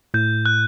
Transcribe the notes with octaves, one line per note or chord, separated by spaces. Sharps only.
A2 G6
F#6